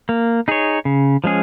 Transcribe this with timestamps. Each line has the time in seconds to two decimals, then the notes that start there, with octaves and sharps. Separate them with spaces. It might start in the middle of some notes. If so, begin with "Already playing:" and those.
0.09 A#3
0.48 D#4 G#4 C#5
0.85 C#3
1.24 F3 G#3 C#4 G#4